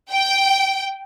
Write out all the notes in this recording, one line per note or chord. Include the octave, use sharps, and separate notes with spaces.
G5